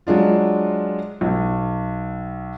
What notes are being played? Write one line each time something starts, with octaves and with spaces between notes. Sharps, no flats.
F#3 G#3 D4 F4
B1